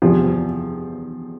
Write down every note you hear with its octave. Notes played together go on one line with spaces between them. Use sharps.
E2 C3 F3